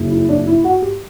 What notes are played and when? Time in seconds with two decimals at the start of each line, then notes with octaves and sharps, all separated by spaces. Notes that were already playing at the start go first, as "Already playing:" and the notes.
Already playing: F#1 F#2 C#3
0.11 E4
0.29 D4
0.47 E4
0.64 F#4
0.82 G4